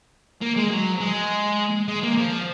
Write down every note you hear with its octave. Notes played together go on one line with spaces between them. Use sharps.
A#3
G#3
F#3
G#3
G#3
A#3
F3